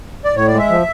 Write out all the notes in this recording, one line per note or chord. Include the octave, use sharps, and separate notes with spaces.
D5
A2 C#5
D5
G#3 E5
F3